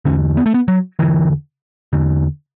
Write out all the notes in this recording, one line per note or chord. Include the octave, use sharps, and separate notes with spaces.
E2 D3 C#4
B3
A3
B3
F#3
E2 D3 E3
E2 D3